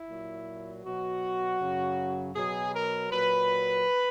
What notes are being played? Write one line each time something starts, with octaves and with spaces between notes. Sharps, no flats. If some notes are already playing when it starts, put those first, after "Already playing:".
Already playing: E4
A#2 F#3
B2 F#3 F#4
F#2 C#3 F#3
B2 F#3 G#4
A#4
A#2 F#3 B4